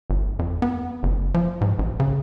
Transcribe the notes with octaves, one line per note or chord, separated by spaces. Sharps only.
G1
F2
B3
F#1
F3
G#2
A1
C#3